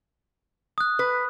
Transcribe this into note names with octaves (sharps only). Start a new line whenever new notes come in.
D#6 F#6
B4